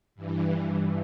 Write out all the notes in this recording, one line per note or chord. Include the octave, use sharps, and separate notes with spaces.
G2 E3